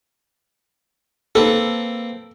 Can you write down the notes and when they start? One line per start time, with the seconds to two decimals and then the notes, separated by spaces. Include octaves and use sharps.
1.35 A#3 C4 A4 B4